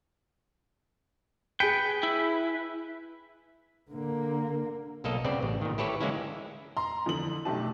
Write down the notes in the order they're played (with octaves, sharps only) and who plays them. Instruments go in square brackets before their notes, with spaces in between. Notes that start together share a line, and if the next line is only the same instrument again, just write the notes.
[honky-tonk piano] G#4 C#7 [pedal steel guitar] B4 [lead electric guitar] G5
[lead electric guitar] E4
[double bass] D3 A#3
[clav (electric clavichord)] B1 A#3 A4 D#5
C#3 B3 C4 D5
A1
A#2 D#3
E4 G4 A4 B4 C#5
D3 E3 G#3 A#3 C#4 E4
[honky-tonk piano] A#5 C6
F2 D3 E3 F#7
B1 A3 D4 G4 A5